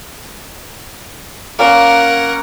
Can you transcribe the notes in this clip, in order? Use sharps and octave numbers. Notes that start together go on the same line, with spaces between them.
A#3 C#4 A#4 F#5